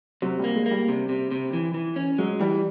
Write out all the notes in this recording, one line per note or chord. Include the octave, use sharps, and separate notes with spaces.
C3 F#3
G3 A#3
G#3
A#3
G3
C3
C3
C3
E3
E3
C#4
F#3 G#3
E3 G3